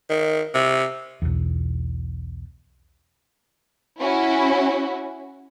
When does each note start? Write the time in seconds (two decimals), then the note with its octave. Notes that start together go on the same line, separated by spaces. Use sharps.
0.10 D#3
0.54 C3
1.22 B1 E2
4.00 C#4 E4 F#4